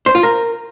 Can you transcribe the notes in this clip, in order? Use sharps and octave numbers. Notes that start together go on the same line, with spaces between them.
C5
F4
A#4